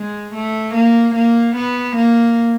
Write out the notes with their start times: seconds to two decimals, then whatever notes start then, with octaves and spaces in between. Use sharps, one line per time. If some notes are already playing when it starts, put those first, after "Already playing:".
Already playing: G#3
0.34 A3
0.74 A#3
1.15 A#3
1.56 B3
1.96 A#3